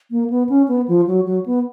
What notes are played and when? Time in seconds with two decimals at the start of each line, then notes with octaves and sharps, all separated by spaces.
0.11 A#3
0.30 B3
0.49 C#4
0.68 B3
0.88 F3
1.07 F#3
1.26 F#3
1.46 B3